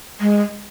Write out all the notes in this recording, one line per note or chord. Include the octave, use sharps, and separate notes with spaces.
G#3